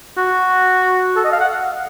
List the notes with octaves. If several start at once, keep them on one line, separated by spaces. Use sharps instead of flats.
F#4
A4
D#5
F5
F#5